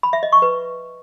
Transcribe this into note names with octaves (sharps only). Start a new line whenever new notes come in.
B5
E5
D#5
C#6
B4